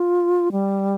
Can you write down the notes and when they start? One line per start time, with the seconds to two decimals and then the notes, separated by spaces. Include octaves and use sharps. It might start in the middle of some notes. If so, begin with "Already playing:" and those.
Already playing: F4
0.52 G3